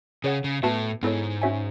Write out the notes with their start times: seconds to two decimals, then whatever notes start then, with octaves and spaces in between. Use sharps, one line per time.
0.24 C#3 G#4 C#5 F#5
0.44 C#3
0.63 A2 B3 F#4 B4 E5 A5
1.03 G#2 B3 E4 A4 C#5
1.42 C#4 F#4 C#5 E5 G#5